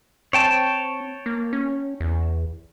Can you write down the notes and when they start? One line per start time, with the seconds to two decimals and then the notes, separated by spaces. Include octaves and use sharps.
0.33 C4 C#5 G5 A5
1.26 A#3
1.53 C#4
2.00 E2